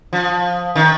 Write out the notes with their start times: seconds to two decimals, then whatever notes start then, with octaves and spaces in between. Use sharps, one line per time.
0.13 F3
0.76 D#3